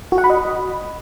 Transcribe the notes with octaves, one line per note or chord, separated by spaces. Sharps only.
F#4
F#5
B5
D#5